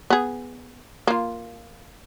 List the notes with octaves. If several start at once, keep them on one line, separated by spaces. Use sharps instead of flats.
B3 G#4
A#3 F4